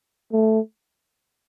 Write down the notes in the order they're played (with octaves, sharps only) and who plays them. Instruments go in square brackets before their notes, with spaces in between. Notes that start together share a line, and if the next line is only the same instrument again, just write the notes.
[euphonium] A3